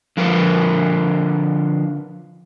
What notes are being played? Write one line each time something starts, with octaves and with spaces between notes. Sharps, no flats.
D3 F3 F4 A#4 B4